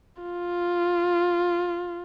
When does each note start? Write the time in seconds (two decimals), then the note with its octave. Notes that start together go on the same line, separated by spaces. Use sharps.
0.23 F4